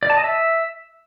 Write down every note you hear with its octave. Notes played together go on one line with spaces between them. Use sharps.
D5
A5
D#5
E5